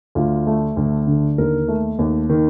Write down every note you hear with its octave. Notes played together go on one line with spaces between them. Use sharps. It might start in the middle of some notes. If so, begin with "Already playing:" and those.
D2 F4
A3
D2
D3
D#2 A#4
A3
D#2
D#3